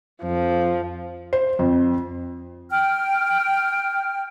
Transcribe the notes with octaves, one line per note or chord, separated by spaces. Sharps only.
F2 F3
C5
F2
G5 F6